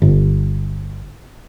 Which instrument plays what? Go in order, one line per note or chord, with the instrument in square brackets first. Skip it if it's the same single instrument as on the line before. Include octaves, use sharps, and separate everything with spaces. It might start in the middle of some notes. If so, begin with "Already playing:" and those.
[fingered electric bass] G1